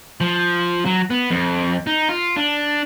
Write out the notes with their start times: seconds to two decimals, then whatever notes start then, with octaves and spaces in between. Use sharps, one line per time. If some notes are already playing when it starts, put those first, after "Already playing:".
0.21 F3
0.86 F#3
1.10 B3
1.31 F2
1.87 D#4
2.09 F4
2.36 D4